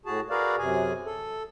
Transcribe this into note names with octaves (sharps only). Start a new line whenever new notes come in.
A2 F#4 G#4 A5
F#4 G#4 A#4 B4 D5 F5
F#2 C3 G#4 G#5
A4